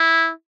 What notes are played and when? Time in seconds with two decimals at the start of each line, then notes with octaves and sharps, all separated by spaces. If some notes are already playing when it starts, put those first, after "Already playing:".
Already playing: E4